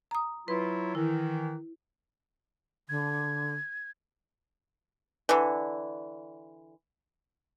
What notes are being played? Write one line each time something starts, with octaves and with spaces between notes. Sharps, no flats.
A#5 D#6
F#3 E4 F4 B4
D#3 E3 E4
D3 G#6
D3 E3